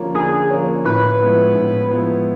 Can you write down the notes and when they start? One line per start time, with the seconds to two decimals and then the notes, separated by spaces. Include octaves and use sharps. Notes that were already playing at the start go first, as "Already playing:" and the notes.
Already playing: D3 F3 A#3 C#4
0.14 D3 G#4
0.50 F3 A#3 C#4
0.85 A2 B4
1.20 F3 G#3 B3 E4
1.55 A2
1.91 F3 G#3 B3 E4